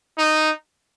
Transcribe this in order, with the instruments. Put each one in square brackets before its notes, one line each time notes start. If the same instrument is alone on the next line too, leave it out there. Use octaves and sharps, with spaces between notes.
[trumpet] D#4